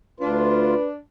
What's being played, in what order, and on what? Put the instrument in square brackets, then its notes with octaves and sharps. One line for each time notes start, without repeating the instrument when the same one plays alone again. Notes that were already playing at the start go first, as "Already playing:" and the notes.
[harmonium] D2 F4 [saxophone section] D4 [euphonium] B4